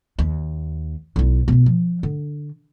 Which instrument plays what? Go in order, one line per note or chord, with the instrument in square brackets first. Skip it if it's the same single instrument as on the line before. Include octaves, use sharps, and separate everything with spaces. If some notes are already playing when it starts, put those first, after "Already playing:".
[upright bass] D#2
B1 E4
B2 B3
F3
D3